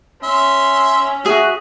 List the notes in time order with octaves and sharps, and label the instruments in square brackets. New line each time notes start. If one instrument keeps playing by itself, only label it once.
[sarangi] C#4 [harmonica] E5 C6
[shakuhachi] F#4 [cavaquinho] G#4 E5